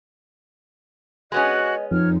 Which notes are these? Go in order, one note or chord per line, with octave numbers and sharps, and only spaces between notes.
G#3 B3 C#4 F#4 D#5 F#6
F2 D#4 C#5 F6